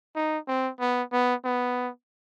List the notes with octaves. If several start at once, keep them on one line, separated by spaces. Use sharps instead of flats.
D#4
C4
B3
B3
B3